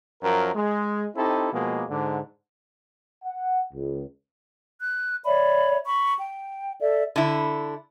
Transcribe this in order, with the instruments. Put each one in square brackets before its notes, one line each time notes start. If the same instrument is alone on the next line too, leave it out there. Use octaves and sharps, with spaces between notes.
[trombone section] F#2 F3 A#4
G#3
C4 D#4 E4 G4 A4
B2 F3 G#3 A#3
G#2 D3
[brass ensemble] F#5
C#2
[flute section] F#6
C#5 D5 E5 B5
B5 C#6
G5
A4 D5 E5
[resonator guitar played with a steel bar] D3 E4